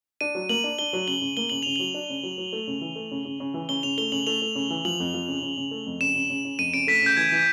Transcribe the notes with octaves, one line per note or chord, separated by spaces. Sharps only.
D4 D#7
F#3
A#3 F#7
D4
D4 G7
F#3
C#3 F#7
C#3
A#3 G7
C#3 F#7
C#3 F7
F#7
F#3
D4
C#3
F#3
F#3
A3
C#3
E3
A3
C#3
C#3
C#3
E3
C#3 G7
C#3 F7
A3 G7
C#3 F#7
A3 F7
A3
C#3
E3
F3 F#7
F2
F3
C#3
C#3
C#3
A3
F2
C#3 E7
C#3
C#3
C#3
F2 D#7
C#3 D7
A3 B6
C#3 G6
E3 G#6
E3